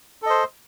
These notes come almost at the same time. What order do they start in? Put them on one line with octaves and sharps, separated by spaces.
A4 D#5 C5